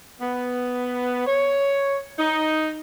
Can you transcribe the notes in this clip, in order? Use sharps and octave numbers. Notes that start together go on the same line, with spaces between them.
B3
C#5
D#4